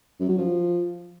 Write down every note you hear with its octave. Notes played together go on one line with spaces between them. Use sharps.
F#2
F#3
F3